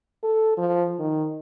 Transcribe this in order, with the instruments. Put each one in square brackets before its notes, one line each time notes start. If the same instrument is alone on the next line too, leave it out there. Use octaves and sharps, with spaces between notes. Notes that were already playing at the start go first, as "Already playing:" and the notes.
[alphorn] A4
F3
D#3